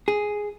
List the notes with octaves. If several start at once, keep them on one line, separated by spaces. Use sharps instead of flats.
G#4